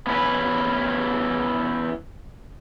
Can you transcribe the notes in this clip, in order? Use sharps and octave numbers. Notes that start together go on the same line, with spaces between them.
B3 C#4 E4 A4 B4